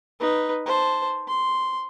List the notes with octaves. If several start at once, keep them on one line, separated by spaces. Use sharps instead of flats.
D#4 B4
C5 A5
C6